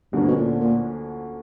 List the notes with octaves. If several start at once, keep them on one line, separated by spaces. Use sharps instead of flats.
D2 G2 D3 F3 A#3 C#4
B2
A#2
A#2